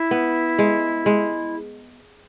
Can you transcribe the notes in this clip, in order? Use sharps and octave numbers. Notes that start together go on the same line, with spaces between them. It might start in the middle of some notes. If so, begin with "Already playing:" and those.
Already playing: E4
B3
G#3
G#3